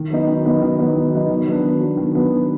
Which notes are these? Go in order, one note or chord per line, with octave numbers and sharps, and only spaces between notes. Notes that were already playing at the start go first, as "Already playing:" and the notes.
Already playing: D#3
F#3 B3 D#4
D#3
F#3 B3 D#4
D#3
F#3 B3 D#4
D#3
F#3 B3 D#4
D#3
F#3 B3 D4
D#3
F#3 B3 D4
D#3
F#3 B3 D4
D#3